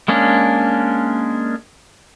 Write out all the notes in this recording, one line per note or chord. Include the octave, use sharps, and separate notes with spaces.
G#3 A#3 C#4 D4